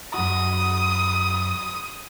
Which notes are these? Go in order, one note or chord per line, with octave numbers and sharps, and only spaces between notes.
F#2 F#4 D#6